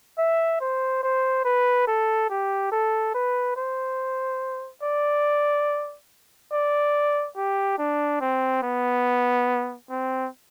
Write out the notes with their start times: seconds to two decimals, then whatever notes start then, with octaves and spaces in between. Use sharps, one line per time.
0.18 E5
0.61 C5
1.03 C5
1.45 B4
1.87 A4
2.30 G4
2.72 A4
3.14 B4
3.56 C5
4.83 D5
6.52 D5
7.36 G4
7.78 D4
8.21 C4
8.63 B3
9.90 C4